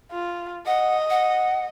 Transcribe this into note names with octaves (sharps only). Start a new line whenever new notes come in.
F4
D#5 F#5
F#5